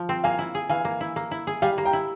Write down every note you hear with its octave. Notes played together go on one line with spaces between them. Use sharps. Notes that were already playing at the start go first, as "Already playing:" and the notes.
Already playing: F3
C4
A#3 F5 G#5
E4
G#4
E3 F5 G#5
A#3
E4
A#3
E4
G#4
G3 F5 G#5
A#3
G5 A#5
E4